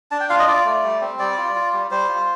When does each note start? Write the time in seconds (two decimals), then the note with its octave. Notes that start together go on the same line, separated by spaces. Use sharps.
0.11 D4 A5
0.20 G5
0.30 F4 F5
0.39 D#5
0.47 F4 D5
0.65 A3
0.83 G3
1.01 C4
1.19 G3 D5
1.38 F4
1.55 F4
1.73 G3
1.91 G3 C5
2.09 F4